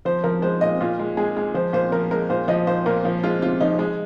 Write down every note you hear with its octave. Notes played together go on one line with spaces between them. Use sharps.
F3 C5
F3 A#4
G#3 C5
A#2 D#5
A#2 F4
G#3
G#3 G#4
G#3
F3 C5
A#2 C5
F3 A#4
G#3 A#4
A#2 C5
F3 D#5
A#2 C5
A#2 A#4
F3
G#3 F4
C3 F4
F3 D#4
G#3